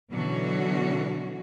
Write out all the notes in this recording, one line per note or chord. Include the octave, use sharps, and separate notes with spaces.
B2 D3 E3 F#3 C#4 F#4